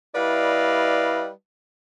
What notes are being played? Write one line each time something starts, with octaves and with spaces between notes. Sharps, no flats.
G3 E4 B4 D5 D#5 F5